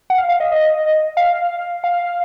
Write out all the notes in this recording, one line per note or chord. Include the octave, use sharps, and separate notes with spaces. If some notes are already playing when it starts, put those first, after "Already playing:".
F#5
F5
F5
D#5
D#5
F5
F5